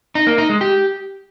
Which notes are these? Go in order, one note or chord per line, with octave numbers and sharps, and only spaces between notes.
D#4
A#3
D#4
G#3
G4